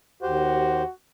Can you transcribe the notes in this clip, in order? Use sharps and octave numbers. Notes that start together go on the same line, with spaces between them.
D#2 F#4 G4 C5